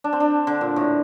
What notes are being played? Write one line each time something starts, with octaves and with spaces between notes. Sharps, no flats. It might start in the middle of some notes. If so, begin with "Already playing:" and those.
D4
C4
D4
D3
A#2
A2